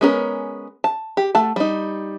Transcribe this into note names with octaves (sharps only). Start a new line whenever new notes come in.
G#3 B3 C#4 A4 A#4
A5
G4
A3 F#5 A5
G3 D#4